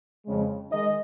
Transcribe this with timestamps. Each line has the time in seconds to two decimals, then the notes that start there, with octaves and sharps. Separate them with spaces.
0.26 F2 C#3 G#3
0.71 D#3 G#3 D#4 D#5